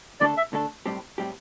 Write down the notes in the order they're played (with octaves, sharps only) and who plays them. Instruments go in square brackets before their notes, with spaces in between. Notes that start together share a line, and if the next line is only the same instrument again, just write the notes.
[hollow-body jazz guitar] D3 A3 D4 A4 [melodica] D5
[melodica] E5
[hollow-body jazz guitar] D3 A3 D4 A4
A2 G3 C4 G4
A2 G3 C4 G4